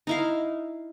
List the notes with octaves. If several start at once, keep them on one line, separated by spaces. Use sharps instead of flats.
D#4 E4 F5